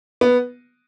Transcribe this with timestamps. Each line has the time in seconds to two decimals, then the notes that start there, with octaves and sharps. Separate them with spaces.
0.21 B3